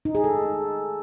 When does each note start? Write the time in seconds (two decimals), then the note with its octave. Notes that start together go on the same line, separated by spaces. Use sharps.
0.05 D#4
0.15 G#4
0.24 A4